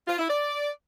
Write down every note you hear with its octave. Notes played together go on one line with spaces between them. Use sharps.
F4
E4
D5